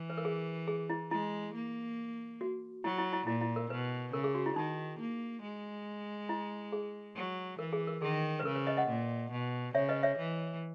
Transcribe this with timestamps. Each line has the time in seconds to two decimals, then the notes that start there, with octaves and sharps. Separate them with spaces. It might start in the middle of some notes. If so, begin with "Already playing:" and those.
Already playing: E3
0.10 B4
0.18 A#4
0.25 G#4
0.68 G#4
0.90 E4
1.11 G#3 E4
1.55 A#3
2.41 F#4
2.84 F#3 E4
2.99 E4
3.13 E4
3.27 A#2 E4
3.41 E4
3.56 A#4
3.70 B2 B4
4.13 C#3 A#4
4.24 G#4
4.35 F#4
4.46 E4
4.56 D#3 D#4
4.99 A#3
5.43 G#3
6.29 E4
6.73 G#4
7.16 F#3
7.59 E3 A#4
7.73 G#4
7.87 A#4
8.02 D#3 G#4
8.40 B4
8.45 C#3 A#4
8.56 B4
8.67 B4 D#5
8.77 D#5 F#5
8.88 A#2
9.31 B2
9.74 C#3 C#5 E5
9.89 B4 D#5
10.03 C#5 E5
10.18 E3